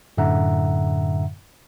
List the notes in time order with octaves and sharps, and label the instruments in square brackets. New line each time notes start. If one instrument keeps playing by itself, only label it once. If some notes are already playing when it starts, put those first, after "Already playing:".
[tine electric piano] F#2 A2 D3 E5 F#5 A#5